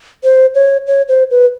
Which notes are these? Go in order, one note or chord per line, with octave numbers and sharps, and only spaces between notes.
C5
C#5
C#5
C5
B4